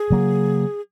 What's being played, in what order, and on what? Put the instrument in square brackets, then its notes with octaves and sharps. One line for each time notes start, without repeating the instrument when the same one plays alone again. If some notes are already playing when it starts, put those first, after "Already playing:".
Already playing: [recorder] G#4
[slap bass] C#3 F#3 A#3